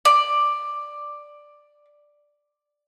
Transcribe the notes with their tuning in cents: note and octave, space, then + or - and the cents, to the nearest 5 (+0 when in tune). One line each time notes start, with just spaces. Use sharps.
D5 +5